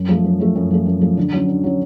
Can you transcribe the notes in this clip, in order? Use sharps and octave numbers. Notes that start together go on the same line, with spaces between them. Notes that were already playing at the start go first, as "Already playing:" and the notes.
Already playing: F#2
F3 A3
F#2
F3 A3
F#2
F3 A3
F#2
F3 A3
D3
F#3 C#4
D3
F#3 C#4